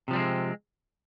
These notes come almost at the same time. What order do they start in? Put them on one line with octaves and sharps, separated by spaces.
C3 F3 G3 C4 G#3